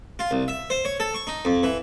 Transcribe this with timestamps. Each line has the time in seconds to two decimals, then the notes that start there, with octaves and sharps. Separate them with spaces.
0.19 F4
0.31 C2
0.48 E5
0.70 C5
0.85 C#5
1.00 A4
1.14 C#6
1.27 D#4
1.45 F2
1.63 E3